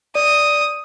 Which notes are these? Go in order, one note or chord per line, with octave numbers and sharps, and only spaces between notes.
D5 D#6